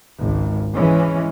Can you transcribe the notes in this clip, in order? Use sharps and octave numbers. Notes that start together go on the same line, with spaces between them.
G#1 C#2
E3 G#3 C#4